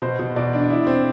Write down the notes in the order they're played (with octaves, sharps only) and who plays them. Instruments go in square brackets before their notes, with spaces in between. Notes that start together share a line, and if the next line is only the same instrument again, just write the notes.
[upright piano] B2 C5
B2
B2 D5
D4
E4
C4